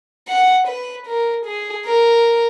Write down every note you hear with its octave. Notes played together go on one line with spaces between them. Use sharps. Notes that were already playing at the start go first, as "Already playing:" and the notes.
F#5
B4
A#4
G#4
A#4